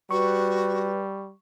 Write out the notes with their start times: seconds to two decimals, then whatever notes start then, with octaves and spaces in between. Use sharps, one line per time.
0.11 G3 F#4 B4 C#6